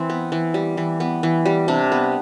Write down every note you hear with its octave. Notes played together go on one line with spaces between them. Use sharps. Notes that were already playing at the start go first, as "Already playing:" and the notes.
Already playing: E3 C4
B3
E3
G3
E3
B3
E3
G3
C3 D4
B3